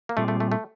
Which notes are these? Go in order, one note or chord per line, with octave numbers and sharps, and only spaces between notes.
A#3
A#2 G3 A3 C4 F4 G#4
A3
A3
A3